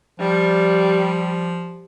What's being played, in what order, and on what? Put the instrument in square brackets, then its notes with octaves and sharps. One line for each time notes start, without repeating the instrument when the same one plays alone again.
[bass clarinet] F3 [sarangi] G3